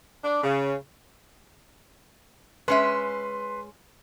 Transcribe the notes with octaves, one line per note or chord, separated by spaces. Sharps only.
D4
C#3
G#3 C#4 B4 E5 C6